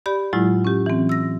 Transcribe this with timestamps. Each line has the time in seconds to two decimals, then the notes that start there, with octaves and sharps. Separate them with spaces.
0.06 G4 D5 B5
0.33 A2 F#3 G#3 E4 F4
0.65 C#4 G4
0.86 E3 C4
1.09 E6 A#6